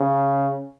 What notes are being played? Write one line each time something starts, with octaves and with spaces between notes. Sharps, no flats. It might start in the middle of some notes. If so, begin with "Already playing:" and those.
Already playing: C#3